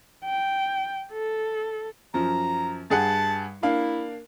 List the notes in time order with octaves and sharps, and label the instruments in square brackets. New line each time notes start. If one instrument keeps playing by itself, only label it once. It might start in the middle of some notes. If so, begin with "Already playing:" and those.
[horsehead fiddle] G5
A4
[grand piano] F#2 F3 [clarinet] A#5
[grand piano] G2 G#4 F#5 [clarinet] A5
[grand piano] A#3 D4 F5 [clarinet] E4